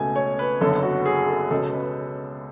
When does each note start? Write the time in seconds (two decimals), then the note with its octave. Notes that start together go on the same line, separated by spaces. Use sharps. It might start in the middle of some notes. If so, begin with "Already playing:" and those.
Already playing: C#2 B2 A3 G#5
0.16 C#5
0.39 B4
0.61 F#1 F#2 D3 F#3 B3 A4
0.83 F#4
1.06 G#4
1.28 A4
1.50 C#2 B2 G#3 C#4 A4
1.73 B4